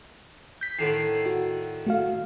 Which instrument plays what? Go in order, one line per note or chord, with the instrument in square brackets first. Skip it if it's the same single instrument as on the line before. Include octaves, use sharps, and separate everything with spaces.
[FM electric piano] G6 B6
[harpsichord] A2 D3 D#3 [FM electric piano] C7
[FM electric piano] F#4
A3 F#4 F5